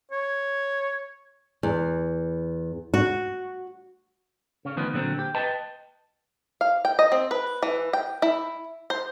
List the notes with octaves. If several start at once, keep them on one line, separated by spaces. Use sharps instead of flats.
C#5
E2
F#4
C#3 C#4
D2 D#3 F3 B3
A#2 D3 F#3 C4
G4
B4 D#5 G5 A5
F5
G5
D#5
C4
B4
E3
G5
E4
C5